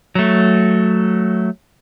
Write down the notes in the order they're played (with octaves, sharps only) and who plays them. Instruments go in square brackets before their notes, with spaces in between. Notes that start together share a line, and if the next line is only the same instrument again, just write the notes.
[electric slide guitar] F#3 A3